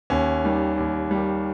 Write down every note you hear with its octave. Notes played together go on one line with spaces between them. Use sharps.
D#2 C#4
D#3 G3
D#2
D#3 G3